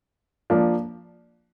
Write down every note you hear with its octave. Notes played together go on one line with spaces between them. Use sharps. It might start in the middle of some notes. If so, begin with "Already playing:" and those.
F3 A#3 D4